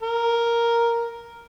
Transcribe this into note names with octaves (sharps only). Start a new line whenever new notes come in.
A#4